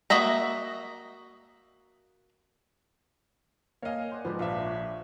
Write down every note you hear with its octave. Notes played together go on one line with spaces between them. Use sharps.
A#3 F#4 D#5 E5 A#5
A#3 A#4 C#5 D#5 F5 G5 G#5
C5 D5 F#5
G#2 F3 B3 G4
A#1 D4 F4 E5
C#5